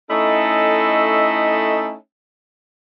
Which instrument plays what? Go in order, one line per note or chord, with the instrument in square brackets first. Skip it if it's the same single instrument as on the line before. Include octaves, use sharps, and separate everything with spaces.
[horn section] A3 C#4 D#4 E4 A4 D#5